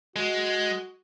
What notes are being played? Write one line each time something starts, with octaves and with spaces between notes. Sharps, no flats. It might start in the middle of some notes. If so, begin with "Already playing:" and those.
G#3 F#4